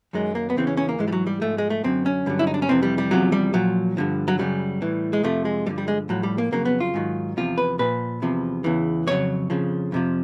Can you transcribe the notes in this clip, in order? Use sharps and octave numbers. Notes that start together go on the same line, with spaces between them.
F#2 D#3 F#3 G#3
A#3
B3
E2 C#3 E3 C4
C#4
C#4
A#3
G#2 E3 G#3
G3
F#3
G3
G#2 F3 A3
G#3
A3
F#2 D3 F#3 C4
C#4
G2 D3 F#3
E4
D#4
D4
C#4
F2 C3 E3 C4
G3
G3
E2 C3 F3 F#3
G3
A#2 F3 F#3
G2 D3 F3
F#3
F#2 C#3 F#3 G3
A2 E3
G#3
F2 C3 F3 A3
G#3
G2 D3 F3 G3
G3
G#3
A2 F3 F#3
G3
A#3
F2 C#3 F#3 A#3
B3
F4
G#2 D#3 F#3
E2 C3 F3 F4
B4
A#2 F3 B4
E2 C3 F3
E2 C#3 E3
F2 C#3 F#3 C#5
F2 C#3 F3
F2 C3 F3